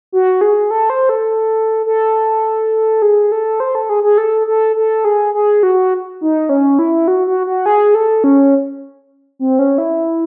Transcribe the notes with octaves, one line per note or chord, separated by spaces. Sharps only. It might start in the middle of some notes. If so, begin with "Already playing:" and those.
F#4
G#4
A4
C5
A4
A4
G#4
A4
C5
A4
G#4
G#4
A4
A4
A4
G#4
G#4
F#4
D#4
C#4
E4
F#4
F#4
F#4
G#4
A4
C#4
C4
C#4
E4